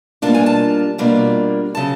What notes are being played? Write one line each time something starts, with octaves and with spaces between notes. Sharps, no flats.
B2 G3 A#3 D4 F4 A5
G#5
A5
B2 G3 A#3 D4 F4
C#3 F#3 A5